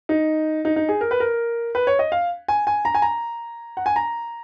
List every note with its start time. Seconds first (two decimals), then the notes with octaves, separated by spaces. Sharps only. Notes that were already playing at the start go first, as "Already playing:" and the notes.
0.09 D#4
0.65 D#4
0.76 D#4
0.89 G#4
1.01 A#4
1.11 B4
1.20 A#4
1.75 B4
1.87 C#5
1.99 D#5
2.12 F5
2.48 G#5
2.67 G#5
2.85 A#5
2.95 G#5
3.02 A#5
3.77 F#5
3.86 G#5
3.96 A#5